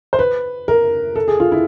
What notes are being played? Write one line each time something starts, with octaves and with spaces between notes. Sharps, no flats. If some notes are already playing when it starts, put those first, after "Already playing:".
C5
B4
A#4
A4
G#4
F4
E4